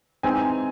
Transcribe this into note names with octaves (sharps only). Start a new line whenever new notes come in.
E3 G#3 C4 D#4 G#5